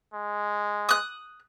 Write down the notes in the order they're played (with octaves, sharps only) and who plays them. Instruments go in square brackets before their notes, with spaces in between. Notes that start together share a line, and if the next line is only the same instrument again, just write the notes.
[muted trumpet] G#3
[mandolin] D#6 F#6